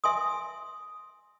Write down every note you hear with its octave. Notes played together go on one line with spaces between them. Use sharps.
E5 G#5 C6 D#6